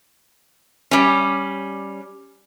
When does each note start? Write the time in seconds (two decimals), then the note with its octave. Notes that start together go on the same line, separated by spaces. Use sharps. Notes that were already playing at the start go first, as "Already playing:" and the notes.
0.91 G3 C#4